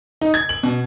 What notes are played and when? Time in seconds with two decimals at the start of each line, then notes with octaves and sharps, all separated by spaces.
0.21 D#4
0.34 G#6
0.49 F#7
0.63 B2